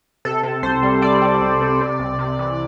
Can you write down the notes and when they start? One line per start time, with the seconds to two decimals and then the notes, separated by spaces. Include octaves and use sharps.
0.25 C3 A4
0.43 C3
0.63 C2 C5
0.83 G3
1.02 G3 D5
1.22 G3
1.41 C2
1.61 C3
1.81 C3
1.99 C2
2.19 C3
2.39 E3